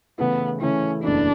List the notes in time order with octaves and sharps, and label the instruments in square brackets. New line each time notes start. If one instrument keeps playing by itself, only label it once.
[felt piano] C#3 E3 A3 E4 [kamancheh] B3
[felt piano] C#3 E3 A3 E4 [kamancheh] C#4
[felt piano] F#1 E2 B2 A3 E4 [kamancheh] D4